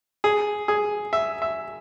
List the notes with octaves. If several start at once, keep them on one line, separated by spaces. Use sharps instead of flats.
G#4
G#4
E5
E5